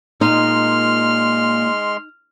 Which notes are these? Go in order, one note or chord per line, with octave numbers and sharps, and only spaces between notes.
A#2 G#3 D#4 C6 F6